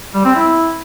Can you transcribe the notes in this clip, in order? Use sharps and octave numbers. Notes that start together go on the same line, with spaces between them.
G3
C4
E4